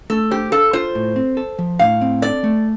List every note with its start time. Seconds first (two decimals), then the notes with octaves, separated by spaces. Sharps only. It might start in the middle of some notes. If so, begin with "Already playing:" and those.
0.10 A3 A4
0.31 G4 C5
0.52 A4 F5
0.73 F4 C5
0.95 A2
1.16 C4
1.37 A4
1.59 F3
1.79 A2 F5
2.01 C4
2.22 A4 D5
2.44 A3